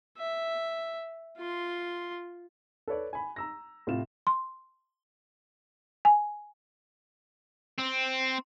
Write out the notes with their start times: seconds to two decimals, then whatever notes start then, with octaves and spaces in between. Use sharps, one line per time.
0.18 E5
1.38 F4 C6
2.88 A4 B4 C#5 D5
3.13 G#5 B5
3.36 A#5 E6 A#6
3.87 A2 C3 F4 E7
4.27 C6
6.05 G#5
7.78 C4